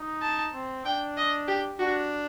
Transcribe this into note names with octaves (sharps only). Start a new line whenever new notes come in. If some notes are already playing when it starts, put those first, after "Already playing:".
Already playing: D#4
A5
C4
D4 G5
D#5
G4
D4 F#4